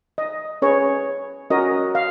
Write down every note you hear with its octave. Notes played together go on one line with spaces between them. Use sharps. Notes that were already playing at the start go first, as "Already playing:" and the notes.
D#5
C#4 G#4 B4 C#5
C#4 F#4 A#4 C#5 D#5
F5